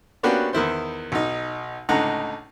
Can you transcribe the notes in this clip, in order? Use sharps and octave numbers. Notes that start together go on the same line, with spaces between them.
A#3 B3 C#4 D4 F#4 G4
E2 D#3 E4 C5
B1 D#4
C#2 A2 D3 D#4 F#5 A#5